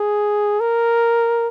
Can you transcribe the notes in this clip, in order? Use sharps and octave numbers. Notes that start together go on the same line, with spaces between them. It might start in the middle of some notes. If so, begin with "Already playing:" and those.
Already playing: G#4
A#4